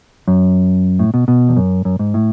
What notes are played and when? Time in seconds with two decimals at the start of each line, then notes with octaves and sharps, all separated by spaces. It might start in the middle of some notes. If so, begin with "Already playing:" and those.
0.28 F#2
0.99 A2
1.14 B2
1.28 B2
1.49 E2
1.57 F#2
1.85 F#2
1.99 G#2
2.14 A2